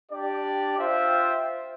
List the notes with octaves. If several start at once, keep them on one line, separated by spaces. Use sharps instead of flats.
D4 G4 D5
F4 C5 E5 G5